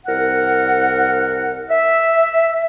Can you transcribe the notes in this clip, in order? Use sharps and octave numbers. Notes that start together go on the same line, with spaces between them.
C2 A#4 F#5
E5